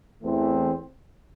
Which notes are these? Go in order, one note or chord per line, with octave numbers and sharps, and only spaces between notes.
E2 E3 A3 C4